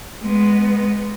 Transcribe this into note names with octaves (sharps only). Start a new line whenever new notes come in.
G#3 B3